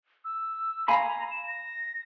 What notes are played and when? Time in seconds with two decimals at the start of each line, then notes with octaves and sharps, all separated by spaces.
0.25 E6
0.88 F5 G#5 A#5 B5
1.31 E7
1.47 A#6